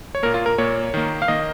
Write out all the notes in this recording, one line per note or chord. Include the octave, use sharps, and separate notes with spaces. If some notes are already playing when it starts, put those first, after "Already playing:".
C#5
A#2 A#3 A#4
F4
A#4
A#2 A#3 C#5
D#3 A#3
F5
D#3 A#3 D#5